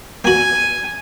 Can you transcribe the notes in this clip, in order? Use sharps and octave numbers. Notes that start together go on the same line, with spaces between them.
A#3 F#4 G#5